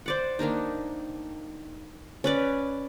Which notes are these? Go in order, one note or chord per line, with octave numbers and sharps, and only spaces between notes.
C5 D5 F#5
D#3 A#3 D4 D#4
C#4 B4 D5